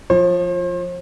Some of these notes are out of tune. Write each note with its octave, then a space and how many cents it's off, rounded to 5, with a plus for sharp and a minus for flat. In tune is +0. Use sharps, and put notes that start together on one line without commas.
F3 +0 C5 +40